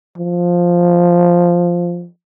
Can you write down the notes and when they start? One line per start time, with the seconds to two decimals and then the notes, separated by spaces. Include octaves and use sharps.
0.17 F3